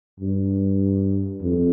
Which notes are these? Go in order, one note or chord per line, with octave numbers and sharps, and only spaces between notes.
G2
F2